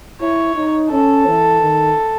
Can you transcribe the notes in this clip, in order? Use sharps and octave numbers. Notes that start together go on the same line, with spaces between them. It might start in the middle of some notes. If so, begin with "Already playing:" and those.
E4 C#5
D#4
C#4 A4
E3
D#3